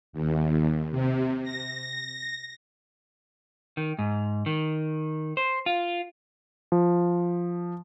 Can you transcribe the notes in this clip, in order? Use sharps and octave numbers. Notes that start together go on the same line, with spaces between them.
D#2
C3
A#6
D#3
G#2
D#3
C5
F4
F3